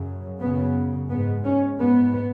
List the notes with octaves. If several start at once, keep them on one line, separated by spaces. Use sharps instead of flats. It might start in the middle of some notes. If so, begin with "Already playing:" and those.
Already playing: F#2 C#3
F#2 C#3 B3
G#2 B3
C#4
G#2 B3